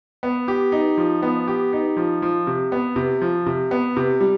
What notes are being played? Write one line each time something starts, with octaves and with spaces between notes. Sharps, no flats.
B3
G4
D#4
F3
B3
G4
D#4
F3
F3
C3
B3
C3
F3
C3
B3
C3
G3